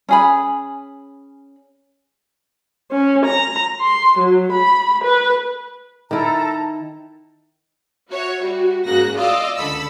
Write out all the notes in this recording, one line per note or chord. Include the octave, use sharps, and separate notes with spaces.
C#4 G#4 B5
C#4
A#5
C6
F#3
B5
B4
D#3 E4 A4 A5 A#5
F#4 C#5 E5
G3 F#4
G#2 C#3 A#3 F#4 F#6 A#6
F4 D5 D#5 F5 D6 E6
C#2 D3 A4 B5 E6